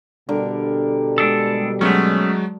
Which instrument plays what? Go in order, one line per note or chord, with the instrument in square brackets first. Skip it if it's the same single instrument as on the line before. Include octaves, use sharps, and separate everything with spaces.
[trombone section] B2 G3 [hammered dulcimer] D3 A#4
[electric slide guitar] G#3 D4 A4
[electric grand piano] F#3 G#3 F#4 [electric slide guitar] A3 B3 C#4